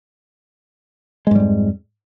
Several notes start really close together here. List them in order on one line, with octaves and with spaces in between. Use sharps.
G#3 G#2 G3 F2